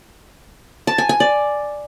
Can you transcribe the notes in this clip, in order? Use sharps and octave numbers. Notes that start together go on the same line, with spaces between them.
A5
G#5
G#5
D5